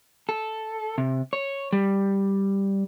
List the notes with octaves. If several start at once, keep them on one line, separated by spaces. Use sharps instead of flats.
A4
C3
C#5
G3